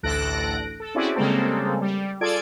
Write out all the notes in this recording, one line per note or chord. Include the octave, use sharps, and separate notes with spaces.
A1 D2 A4 F#6 A#6 D7
A4
C4 C#4 E4 F#4 G#4 D5
C#3 G3 G#3 A#3 C4 A4
G3
F4 G#4 A4 D5 G#6 D7